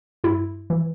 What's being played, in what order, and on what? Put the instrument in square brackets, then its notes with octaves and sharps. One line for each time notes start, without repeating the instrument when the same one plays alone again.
[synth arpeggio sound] G2 E4
E3